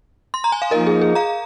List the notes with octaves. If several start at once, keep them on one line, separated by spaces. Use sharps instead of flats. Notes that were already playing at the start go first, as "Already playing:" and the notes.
C6
A#5
G#5
F5
F3 A#3 D#4 A#4 D#5
G#4
G#4
F5 A#5